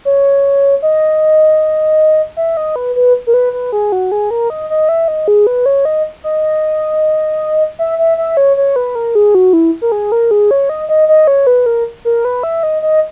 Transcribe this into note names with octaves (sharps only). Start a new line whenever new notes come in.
C#5
D#5
E5
D#5
B4
B4
A#4
B4
B4
G#4
F#4
G#4
A#4
D#5
D#5
E5
D#5
G#4
B4
C#5
D#5
D#5
E5
E5
E5
C#5
C#5
B4
A#4
G#4
F#4
E4
A#4
G#4
A#4
G#4
C#5
D#5
D#5
D#5
C#5
B4
A#4
A#4
B4
E5
D#5
D#5